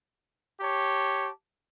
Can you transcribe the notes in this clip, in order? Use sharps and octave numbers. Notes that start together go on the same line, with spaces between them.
G4 C#5 A5